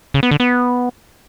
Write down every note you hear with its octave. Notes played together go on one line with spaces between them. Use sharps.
C#3
B3
D3
B3